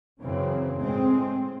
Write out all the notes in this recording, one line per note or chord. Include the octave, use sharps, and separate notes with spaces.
F#2 C#3 E3 C4
A2 G#3 C4